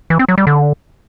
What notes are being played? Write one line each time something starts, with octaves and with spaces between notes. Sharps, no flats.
E3
C4
F#3
G3
D3